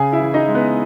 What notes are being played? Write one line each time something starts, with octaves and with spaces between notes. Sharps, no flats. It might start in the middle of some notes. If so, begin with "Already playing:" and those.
Already playing: C#3 G#4 G#5
E4 E5
E3
D#4 D#5
G#3
B3 B4